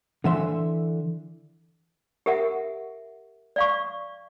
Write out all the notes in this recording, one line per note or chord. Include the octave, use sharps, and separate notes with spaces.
D3 E3 E5 C6
G4 A#4 E5 F#5
D5 F5 C#6